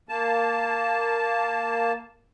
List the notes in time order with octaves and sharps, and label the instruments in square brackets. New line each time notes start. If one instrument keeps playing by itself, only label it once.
[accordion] A#3 A5